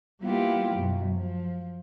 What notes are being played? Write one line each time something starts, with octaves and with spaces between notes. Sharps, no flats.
G3 A#3 B3 E4 F4 G4
F#2 B2
F3